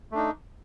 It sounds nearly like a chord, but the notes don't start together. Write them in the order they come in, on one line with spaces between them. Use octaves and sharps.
A3 D4 D#4